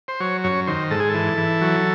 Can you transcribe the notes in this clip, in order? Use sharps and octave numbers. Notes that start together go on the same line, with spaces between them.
C5
F#3 C#5
F#2 C#5
D#3 C5
G#2 A4
G#4
E3 A4
E3
F#3